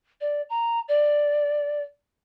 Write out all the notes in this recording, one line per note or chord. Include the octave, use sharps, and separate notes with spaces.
D5
A#5
D5